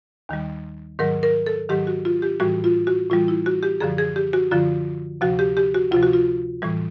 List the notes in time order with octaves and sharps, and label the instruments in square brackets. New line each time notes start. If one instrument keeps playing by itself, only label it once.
[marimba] D#2 D#3 G3
G#2 D#3 F#3 A#4
A#4
A4
G#2 D#3 F#3 G4
F#4
F4
G4
A2 E3 G3 F#4
F4
F#4
A2 E3 G3 F4
E4
F#4
G4
F#2 D3 F3 G#4
G#4
G4
F#4
F#2 D3 F3 F4
D2 C3 F3 F#4
G4
G4
F#4
D2 C3 F3 F4
F#4
F4
A2 E3 G3